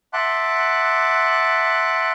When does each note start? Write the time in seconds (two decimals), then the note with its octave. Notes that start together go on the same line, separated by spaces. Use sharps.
0.13 E5 F#5 A5 C6 D6 F#6